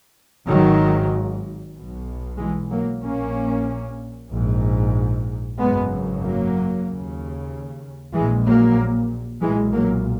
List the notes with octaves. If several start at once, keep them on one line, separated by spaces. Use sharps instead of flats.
G#1 G#2 D#3 F#3
B1 B2
E3 G#3
F#3 A#3
A#1 A#2 A#3 C#4
A#1 G#2
G#1 F#2 C#3 G#3 B3
F#3 A#3
D#2 C#3
A#1 A#2 E3 G#3
F#3 A#3
B1 A#2 E3 G#3
F#3 A#3